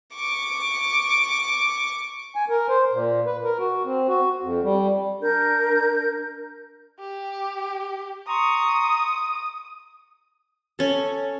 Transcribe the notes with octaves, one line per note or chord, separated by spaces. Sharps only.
C#6 D6
G#5
A#4
C5
A#2
B4
A#4
F#4
C4
F#4
F2
G3
D4 A#4 G6
G4
A#5 C6 C#6 D#6
C#4 A4